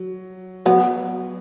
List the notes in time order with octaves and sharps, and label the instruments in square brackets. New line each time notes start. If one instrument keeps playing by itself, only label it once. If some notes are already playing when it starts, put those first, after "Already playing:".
Already playing: [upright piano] F#3
[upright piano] F#3 [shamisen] B3